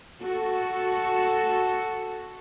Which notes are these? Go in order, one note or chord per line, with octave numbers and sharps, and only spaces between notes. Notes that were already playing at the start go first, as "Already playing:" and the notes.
F#4 A4